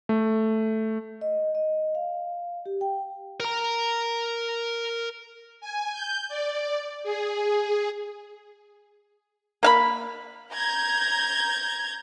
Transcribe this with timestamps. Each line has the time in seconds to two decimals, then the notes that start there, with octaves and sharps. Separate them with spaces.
0.09 A3
1.21 D#5
1.55 D#5
1.95 F5
2.66 G4
2.81 G5
3.40 A#4 A#5
5.61 G#5
5.92 G6
6.29 D5
7.04 G#4
9.63 A#3 F5 B5
10.51 A#5 G6 G#6